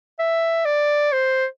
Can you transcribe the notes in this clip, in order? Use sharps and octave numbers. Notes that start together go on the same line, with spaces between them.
E5
D5
C5